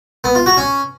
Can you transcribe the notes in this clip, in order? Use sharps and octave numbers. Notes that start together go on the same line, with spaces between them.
B3
F4
F#4
C#4